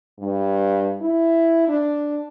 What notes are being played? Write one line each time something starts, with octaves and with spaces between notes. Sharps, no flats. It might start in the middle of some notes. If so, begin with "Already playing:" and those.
G2
E4
D4